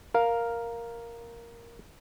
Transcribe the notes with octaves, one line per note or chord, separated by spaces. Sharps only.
A#4 F5